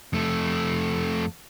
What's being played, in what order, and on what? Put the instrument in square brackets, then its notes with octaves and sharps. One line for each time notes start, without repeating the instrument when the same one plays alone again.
[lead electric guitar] F2 A3